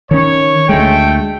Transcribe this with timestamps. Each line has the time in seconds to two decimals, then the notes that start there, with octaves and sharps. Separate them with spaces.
0.11 D#3 C#4 C#5
0.69 D2 G#3 A3 G5